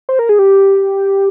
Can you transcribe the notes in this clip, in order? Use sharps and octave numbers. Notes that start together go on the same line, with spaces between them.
C5
A#4
G#4
G4